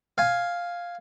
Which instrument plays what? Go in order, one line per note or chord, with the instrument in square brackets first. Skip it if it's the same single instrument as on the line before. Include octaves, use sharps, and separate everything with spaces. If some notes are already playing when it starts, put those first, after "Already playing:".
[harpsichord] F5 G#5